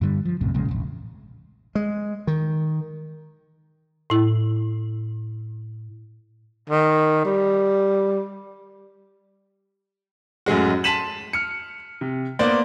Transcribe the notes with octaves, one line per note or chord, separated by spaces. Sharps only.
G2 D3 F3 G3
F3
B1 F#2 A2 C3
A#1 A#2 C#3 G#3
E1 A1
G#3
D#3
A2 E4
D#3
G3
F#2 A2 G#3 F#4
A5 C6 B6 D#7 E7 F#7
F6 C#7
C3
A#3 B3 C5 D5